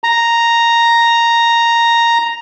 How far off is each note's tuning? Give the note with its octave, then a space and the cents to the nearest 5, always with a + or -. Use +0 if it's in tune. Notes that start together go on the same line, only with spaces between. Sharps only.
A#5 +0